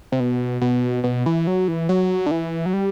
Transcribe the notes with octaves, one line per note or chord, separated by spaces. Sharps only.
C3
B2
B2
B2
E3
F#3
E3
F#3
D3
E3
F#3
G3